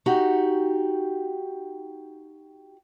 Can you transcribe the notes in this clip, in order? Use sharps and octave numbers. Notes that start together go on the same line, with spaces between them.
D#4 F#4 G4